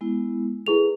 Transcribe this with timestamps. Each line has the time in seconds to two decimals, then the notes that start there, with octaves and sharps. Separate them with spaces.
0.01 G#3 B3 E4
0.66 E4 G#4 A4 B4 F7